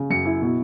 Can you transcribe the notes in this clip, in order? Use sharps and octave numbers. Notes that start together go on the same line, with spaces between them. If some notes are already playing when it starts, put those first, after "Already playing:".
Already playing: C#3
F#2 C#7
E4
B2